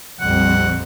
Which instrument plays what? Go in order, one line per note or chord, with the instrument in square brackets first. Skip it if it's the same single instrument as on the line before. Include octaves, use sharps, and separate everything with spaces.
[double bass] A#1 F2 [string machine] G3 C4 [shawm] F#5